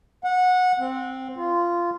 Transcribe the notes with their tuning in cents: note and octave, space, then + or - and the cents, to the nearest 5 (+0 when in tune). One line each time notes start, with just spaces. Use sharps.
F#5 -20
C4 +0
F4 -15